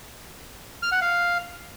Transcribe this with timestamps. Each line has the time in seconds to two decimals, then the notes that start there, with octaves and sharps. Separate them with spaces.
0.83 F6
0.92 F#5
1.01 F5